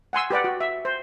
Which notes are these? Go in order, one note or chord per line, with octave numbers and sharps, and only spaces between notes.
F#5 G#5 C6 E6
G4 B4 D5 F#5
F#4
E5
C5